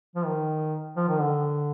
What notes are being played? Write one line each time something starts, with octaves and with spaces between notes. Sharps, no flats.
F3
D#3
F3
D#3
D3